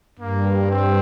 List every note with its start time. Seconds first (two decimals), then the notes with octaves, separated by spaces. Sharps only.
0.19 G2 A#3
0.71 C4